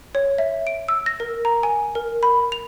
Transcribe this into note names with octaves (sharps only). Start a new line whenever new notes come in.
C#5
E5
D7
E6
A#6
A#4
A#5
G#5
A#4
B5
F7